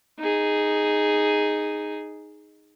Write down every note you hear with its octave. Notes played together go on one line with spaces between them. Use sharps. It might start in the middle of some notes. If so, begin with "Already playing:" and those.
D#4 G#4